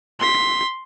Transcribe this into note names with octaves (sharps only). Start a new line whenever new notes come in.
C6 B6